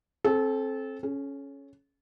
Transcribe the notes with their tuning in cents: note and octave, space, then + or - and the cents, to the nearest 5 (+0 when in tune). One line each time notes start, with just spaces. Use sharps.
C4 +25 A4 -25
C#4 +0 A4 -45